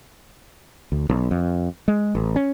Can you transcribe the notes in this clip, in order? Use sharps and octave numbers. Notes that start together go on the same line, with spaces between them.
D2
B1
F2
G#3
A1
C#4